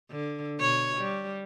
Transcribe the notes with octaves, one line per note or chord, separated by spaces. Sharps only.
D3
B2 C#5
G3